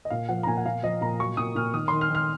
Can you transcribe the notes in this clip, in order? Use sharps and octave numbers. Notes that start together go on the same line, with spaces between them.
D#5
A#2 F5
F3 F#5
A#5
A#2 G#5
F#5
A#2 F5
F3 D#5
A#2 A#5
F#3 C#6
A#2 D#6
A#2 F6
D#3 D#6
D#3 C6
F6
D#3
F6